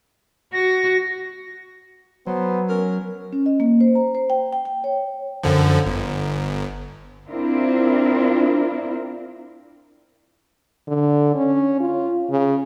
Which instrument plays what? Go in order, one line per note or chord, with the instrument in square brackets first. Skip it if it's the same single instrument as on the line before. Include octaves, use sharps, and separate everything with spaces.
[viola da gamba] F#4 [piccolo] A#6
[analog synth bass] F#3 [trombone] B3 [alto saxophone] C5
[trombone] C#4 [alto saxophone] A#4
[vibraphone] C#4
D#5
A#3
C5
A#5
C5
G5
G5
G5
C#5
[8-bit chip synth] F#2 D3 F3
G1
[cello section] C4 D4 E4 F4 A#4
[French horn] D3
C#4
F4
C#3